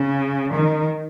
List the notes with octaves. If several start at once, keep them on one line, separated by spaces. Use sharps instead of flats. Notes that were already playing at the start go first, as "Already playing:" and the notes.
Already playing: C#3
D#3